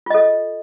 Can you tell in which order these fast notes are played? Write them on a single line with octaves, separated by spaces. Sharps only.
F4 D#5 A4